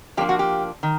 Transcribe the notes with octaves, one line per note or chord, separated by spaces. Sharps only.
F3 A#3 D4 G4
F#4
G4
D#3